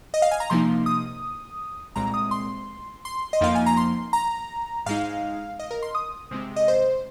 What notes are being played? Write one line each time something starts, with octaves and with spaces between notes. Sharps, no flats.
D#5
F5
G#5
A#5
C3 F3 A#3 D#4 C6
D#6
C2 A#2 G#3 C4 A#5
D#6
C6
C6
D#5
F2 F3 A#3 D#4 F5
G#5
A#5
C6
A#5
G#2 G#3 D#4 F5
D#5
A#4
C6
D#6
C3 G#3 C4
D#5
C5